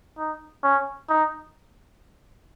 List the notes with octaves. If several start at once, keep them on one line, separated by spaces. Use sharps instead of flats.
D#4
C#4
D#4